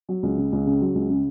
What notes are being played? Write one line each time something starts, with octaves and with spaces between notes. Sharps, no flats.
F#3
C#2
C#3
C#2
C#3
F#3
C#2
C#3